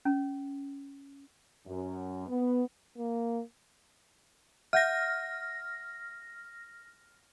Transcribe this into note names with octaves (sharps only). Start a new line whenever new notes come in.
C#4
F#2
B3
A#3
E5 F#5 F6 G6 A#6